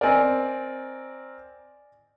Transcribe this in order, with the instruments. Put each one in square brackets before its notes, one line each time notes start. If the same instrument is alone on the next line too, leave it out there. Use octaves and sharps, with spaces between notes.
[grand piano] C4 A#4 [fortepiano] D5 D#5 G#5